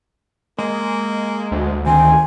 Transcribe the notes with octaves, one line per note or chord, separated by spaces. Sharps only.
G#3 A#3
D2
D#3 C4 G#5